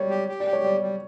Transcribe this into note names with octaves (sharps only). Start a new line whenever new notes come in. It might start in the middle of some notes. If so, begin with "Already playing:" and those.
Already playing: G3 C#5
G4
G4
D5
G4
C#5
G3 D5
G3